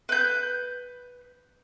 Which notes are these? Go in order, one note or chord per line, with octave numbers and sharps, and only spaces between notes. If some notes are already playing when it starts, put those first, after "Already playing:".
B4 G6